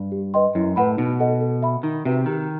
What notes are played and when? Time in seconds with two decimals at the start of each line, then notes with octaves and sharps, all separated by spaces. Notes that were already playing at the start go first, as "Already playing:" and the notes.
Already playing: G2
0.12 G4
0.34 B4 D#5 G5 C6
0.55 F#2 E4
0.76 A2 B4 F#5 B5
0.97 B2 D#4
1.20 A4 D#5 F#5
1.41 A4
1.62 E5 B5
1.83 D#3 D#4
2.05 C3 F#4 B4 E5
2.26 D#3 G4